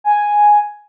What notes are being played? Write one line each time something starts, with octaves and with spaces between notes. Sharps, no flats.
G#5